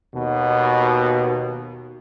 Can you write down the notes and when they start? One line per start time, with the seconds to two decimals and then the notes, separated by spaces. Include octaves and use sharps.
0.16 D#2 B2